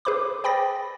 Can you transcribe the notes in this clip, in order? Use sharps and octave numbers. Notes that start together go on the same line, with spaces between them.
G#4 B4 C5 B5 D6
C5 G5 B5 D#6 A6 A#6